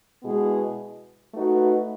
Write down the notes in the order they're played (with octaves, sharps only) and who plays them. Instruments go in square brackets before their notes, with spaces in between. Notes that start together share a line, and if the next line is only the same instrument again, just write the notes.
[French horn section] B2 G#3 B3 E4 G#4
A3 D#4 F#4 B4